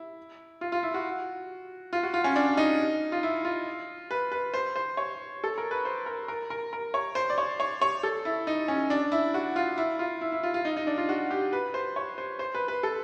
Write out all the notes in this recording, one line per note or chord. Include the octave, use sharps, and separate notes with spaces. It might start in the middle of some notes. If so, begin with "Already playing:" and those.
Already playing: E4
F4
F4
E4
F#4
F4
F#4
F4
C#4
D4
D#4
F4
E4
F4
B4
B4
C5
C5
C#5
A4
A#4
B4
C5
A#4
A#4
A#4
A#4
C#5
C5
D5
C#5
C#5
C#5
A4
E4
D#4
C#4
D4
E4
F#4
F4
E4
F4
E4
E4
F4
F4
D#4
D#4
D4
F4
F#4
G4
B4
C5
C#5
C5
C5
B4
B4
A4